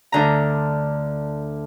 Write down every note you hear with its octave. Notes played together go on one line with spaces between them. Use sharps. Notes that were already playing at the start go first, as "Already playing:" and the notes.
D2 D3 A#5